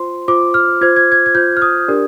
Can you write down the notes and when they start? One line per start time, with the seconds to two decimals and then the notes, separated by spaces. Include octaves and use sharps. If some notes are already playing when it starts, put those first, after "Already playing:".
Already playing: F4 C5 C6
0.28 F4 C5 D6
0.54 F6
0.81 F4 C5 G#6
0.96 G#6
1.12 G#6
1.26 G#6
1.35 F4 C5 G6
1.57 F6
1.62 D#6
1.88 D4 G4 A#4 D5